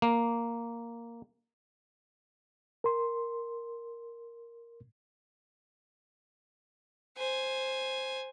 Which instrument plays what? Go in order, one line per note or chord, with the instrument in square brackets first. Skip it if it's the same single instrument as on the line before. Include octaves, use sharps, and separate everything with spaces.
[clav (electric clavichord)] A#3
[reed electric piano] A#4 C6
[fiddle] C5 G#5